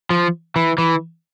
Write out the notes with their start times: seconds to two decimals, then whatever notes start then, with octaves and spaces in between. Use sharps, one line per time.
0.10 F3
0.56 E3
0.78 E3